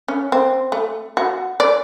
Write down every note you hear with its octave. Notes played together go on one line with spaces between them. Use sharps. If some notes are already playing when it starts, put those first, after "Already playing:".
C#4
C4
A3
F#4
D5